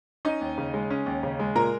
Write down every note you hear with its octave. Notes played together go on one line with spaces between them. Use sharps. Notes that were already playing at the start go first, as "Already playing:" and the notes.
C#4 D#4 D#5
D#2
C#3
G#3
C#4
D#2
C#3
G#3
A#2 A#4 A#5